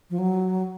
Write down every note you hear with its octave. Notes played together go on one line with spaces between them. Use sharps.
F3
F#3